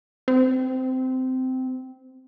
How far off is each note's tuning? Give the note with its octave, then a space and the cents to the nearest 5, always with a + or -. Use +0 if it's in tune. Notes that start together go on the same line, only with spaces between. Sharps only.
C4 -15